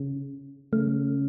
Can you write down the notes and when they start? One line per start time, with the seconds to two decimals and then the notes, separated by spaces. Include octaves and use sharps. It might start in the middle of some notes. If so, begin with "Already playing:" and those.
Already playing: C#3
0.73 C#3 A3